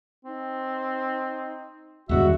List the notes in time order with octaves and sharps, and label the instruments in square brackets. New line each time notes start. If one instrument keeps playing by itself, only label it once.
[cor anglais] C4 [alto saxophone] D#4
[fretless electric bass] E2 G2 D#3 [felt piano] G3 G#3 [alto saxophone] F#4 [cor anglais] E5